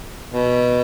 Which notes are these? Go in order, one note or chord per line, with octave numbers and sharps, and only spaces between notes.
B2